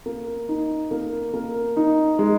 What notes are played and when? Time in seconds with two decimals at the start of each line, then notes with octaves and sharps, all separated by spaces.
0.06 A#3
0.49 D#4
0.91 A#3
1.34 A#3
1.77 D#4
2.19 G#3